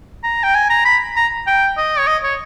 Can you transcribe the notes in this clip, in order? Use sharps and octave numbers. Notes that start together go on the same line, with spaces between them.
A#5
G5
G#5
A#5
B5
A#5
G5
D#5
C#5
D#5
C#5